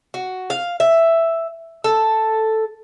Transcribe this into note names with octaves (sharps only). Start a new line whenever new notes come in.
F#4
F5
E5
A4